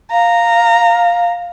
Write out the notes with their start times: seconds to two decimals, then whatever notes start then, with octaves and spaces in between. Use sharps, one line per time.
0.11 F5 A#5